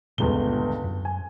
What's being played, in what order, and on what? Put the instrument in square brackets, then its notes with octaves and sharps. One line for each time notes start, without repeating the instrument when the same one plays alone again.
[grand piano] G1 C#2 G7 [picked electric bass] A#2 G3 B3
[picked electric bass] F#2
[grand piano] G#5